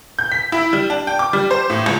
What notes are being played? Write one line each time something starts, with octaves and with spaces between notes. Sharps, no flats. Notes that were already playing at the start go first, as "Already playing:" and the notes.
G6
B6
E4
G3
D4
G5
D6
G3
C5
A2
C#2